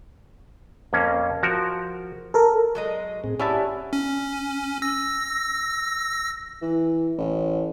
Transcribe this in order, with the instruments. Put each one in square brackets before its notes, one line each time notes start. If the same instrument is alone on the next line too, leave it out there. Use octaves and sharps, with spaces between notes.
[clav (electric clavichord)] F2 A#3 C#4
F3 F#4 A#4
[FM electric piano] A4 A#4
[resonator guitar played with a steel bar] F#3 G#3 D#5
[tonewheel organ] A2 C4 G#4
[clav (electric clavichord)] C#4 E5 A5 [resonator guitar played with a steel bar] E4 [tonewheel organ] G4 D5 F#5
[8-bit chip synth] C#4
E6 A#6
[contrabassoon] E3
A1